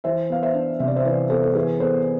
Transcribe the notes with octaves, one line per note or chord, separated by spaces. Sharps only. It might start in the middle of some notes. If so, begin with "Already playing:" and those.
E3 C5 E5
B3 F5
C5 E5
D4
C3 E5
D5
C5 E5
E3 B4 D5
B3 A4 C5
A4
E3 G#4 B4
B3 A4 C5